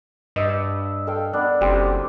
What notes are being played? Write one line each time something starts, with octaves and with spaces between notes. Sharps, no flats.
G2 D#5 E5
A4 F5 G5
B3 D4
F#1 C4 G4 C5